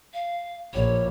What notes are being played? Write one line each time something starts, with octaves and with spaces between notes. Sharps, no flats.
F5
A#1 C#5